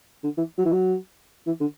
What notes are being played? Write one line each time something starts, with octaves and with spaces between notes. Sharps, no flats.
D3
E3
F#3
E3
F#3
E3
D3